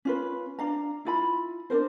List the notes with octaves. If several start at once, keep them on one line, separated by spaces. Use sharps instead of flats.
C#4 F4 B4
D4 F5 A#5
E4 F4 B5
D4 F4 A#4 C5